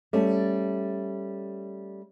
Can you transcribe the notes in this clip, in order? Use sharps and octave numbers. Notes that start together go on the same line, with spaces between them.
G3 A3 C#4